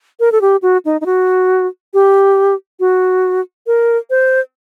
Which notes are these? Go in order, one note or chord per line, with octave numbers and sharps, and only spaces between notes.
A#4
A4
G4
F#4
D#4
D#4
F#4
G4
F#4
A#4
C5